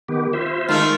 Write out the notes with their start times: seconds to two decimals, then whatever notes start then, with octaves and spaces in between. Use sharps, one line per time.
0.08 D#3 B3 G4
0.33 F4 C5 E5
0.68 D#3 G#3 A3 F4